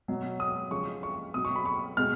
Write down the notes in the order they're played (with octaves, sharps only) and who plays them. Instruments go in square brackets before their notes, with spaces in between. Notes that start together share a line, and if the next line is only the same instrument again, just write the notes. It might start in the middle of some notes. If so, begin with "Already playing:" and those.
[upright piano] B2 F#3
D#6
C#3 F3 G#3 C#6
C#6
B2 F#3 D#6
C#6
B5
C#6
B2 G#3 F6